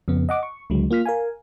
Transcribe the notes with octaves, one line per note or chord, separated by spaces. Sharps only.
F2 C#3 B3
D#5 F#5 D6
C#6
C#2 D3 F#3 G#3
A#3 F4 F6 B6
A#4 F5 G#5